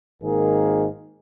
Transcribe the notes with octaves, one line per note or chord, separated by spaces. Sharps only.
G#1 G#2 D#3 A#3 G#4 A#4